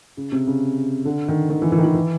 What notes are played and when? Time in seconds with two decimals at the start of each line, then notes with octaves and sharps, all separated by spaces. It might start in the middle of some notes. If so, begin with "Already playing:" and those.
0.17 C#3
0.32 C3
0.47 C#3
1.05 D3
1.28 D#3
1.50 D#3
1.62 E3
1.72 E3
1.78 D#3
1.84 E3
1.94 E3